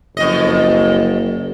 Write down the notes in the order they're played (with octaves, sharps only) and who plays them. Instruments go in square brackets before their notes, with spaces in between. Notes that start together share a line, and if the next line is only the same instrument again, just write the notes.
[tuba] F#1 [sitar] F2 D#5